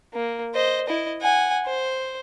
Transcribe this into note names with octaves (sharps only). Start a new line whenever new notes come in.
A#3
C5 D#5
E4 D#5
F#5 G#5
C5